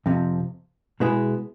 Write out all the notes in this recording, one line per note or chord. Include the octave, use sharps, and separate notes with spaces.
F2 C3 F3
B2 G#3 B3 E4 G#4